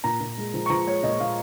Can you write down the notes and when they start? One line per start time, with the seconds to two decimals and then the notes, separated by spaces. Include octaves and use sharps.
0.04 A#2 A#5
0.21 A#2
0.37 G#3
0.54 F3
0.66 C#6
0.70 F3 A#5
0.87 G#3 C#5
1.03 A#2 D#5
1.20 A#2 F5